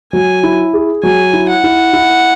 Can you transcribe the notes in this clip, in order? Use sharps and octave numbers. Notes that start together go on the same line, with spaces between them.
F#3 G#5
E4
G#4
F#3 G#5
E4
F#5
E4
E4